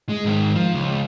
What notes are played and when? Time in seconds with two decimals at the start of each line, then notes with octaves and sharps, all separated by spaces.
0.09 G#3
0.25 G#2 D#3
0.56 F3
0.75 C#2